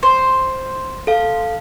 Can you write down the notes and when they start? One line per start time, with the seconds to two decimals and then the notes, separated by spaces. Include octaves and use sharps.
0.03 C5
1.07 A4 F5